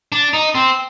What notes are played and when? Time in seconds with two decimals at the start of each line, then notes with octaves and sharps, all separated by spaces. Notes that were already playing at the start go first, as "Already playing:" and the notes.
0.12 D4
0.33 D#4
0.55 C4